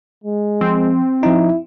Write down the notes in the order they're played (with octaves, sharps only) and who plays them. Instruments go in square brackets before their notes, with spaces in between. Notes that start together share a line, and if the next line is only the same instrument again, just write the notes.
[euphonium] G#3
[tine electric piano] F3 [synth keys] C4
[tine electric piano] F3 D#4 [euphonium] E4